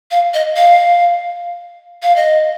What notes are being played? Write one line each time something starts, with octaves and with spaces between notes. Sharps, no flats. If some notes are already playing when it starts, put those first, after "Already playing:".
F5
D#5
F5
F5
D#5